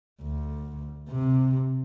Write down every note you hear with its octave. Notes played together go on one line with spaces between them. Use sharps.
D2
C3